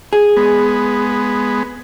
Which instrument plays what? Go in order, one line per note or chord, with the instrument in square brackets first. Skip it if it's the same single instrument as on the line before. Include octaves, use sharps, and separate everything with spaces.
[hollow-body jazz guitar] G#4
[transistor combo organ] G#3 B3